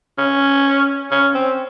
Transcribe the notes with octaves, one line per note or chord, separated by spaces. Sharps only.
C#4
C#4
C4